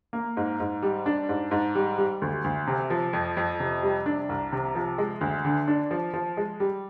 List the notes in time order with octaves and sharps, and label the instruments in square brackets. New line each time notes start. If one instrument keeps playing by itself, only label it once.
[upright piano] A#3
G#2
G#2
G3
D4
G#2
G#2
G3
G3
D2
D2
C3
F3
F2
F2
C3
G3
D4
C2
C3
F3
G#3
D2
D3
D4
F3
F3
G#3
G3